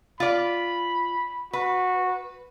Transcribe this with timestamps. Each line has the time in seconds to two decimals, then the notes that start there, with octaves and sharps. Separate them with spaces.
0.20 F4 D5 B5
1.53 F#4 B4